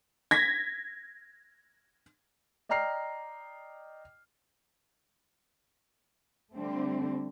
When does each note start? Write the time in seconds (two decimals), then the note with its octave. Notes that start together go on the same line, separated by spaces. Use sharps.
0.31 G#6 A#6 B6
2.69 D5 D#5 G5 A#5 F6 C7
6.55 D3 G3 A3 C4